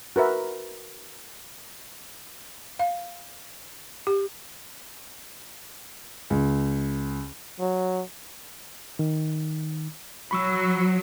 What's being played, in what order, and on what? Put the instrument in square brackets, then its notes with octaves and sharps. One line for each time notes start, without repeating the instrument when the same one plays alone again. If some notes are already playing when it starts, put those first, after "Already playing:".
[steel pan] F#4 A#4 B4 E5
[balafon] F5
G4
[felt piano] C#2
[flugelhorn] F#3
[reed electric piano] D#3
[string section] F#3 [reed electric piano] B5 C#6 E6